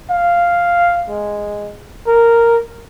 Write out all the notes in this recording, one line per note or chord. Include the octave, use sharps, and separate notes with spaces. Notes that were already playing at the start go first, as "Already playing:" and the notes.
F5
G#3
A#4